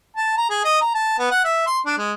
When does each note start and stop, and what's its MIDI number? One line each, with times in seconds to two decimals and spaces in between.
0.17 0.33 81
0.38 0.48 82
0.50 0.61 68
0.64 0.81 75
0.81 0.90 82
0.95 1.18 81
1.19 1.27 59
1.31 1.43 78
1.44 1.64 76
1.66 1.79 84
1.86 1.97 62
1.98 2.12 56